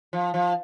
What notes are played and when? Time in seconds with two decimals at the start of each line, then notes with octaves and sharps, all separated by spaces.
0.13 F3
0.34 F3